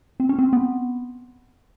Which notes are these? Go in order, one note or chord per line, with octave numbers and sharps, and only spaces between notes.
C4
C#4
C4
B3